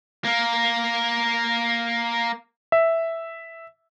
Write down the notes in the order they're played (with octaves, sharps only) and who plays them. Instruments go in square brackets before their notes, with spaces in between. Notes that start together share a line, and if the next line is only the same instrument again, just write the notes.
[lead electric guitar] A#3 A#4
[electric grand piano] E5